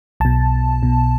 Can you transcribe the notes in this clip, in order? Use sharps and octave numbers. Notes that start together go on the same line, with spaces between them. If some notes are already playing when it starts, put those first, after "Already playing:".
B1 B2 A5
B1 B2